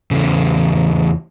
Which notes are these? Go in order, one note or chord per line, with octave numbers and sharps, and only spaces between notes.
E2 C#3